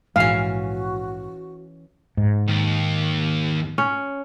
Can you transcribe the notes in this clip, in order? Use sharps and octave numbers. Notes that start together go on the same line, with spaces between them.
A#1 G#2 E3 G#3 C#4 F#4 F5
G#2
D#2
C#4